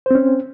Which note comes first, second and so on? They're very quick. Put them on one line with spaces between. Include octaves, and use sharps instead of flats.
C5 C4 C#4